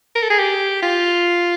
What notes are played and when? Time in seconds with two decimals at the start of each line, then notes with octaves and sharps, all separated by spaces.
0.15 A#4
0.23 A4
0.30 G#4
0.39 G4
0.83 F4